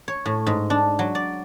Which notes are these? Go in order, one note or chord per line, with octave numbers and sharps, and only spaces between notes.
C#5
A2
G#2
D4
F#3
D5